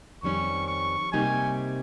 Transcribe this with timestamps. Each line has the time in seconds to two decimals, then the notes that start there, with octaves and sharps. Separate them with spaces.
0.23 F2 D#3 G3 C#4 C#6
0.67 C#6
1.12 C3 G3 A#3 D#4 G4 G#5